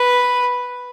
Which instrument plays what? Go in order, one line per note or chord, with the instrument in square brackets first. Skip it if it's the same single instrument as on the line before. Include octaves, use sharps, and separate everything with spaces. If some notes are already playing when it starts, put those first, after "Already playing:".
Already playing: [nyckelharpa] B4